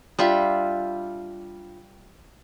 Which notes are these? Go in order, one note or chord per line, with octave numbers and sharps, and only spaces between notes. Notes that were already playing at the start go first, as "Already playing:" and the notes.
G3 D4 F4 E5